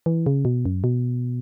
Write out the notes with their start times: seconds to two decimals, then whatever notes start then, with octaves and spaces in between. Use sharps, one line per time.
0.06 E3
0.26 C#3
0.45 B2
0.66 F#2
0.84 B2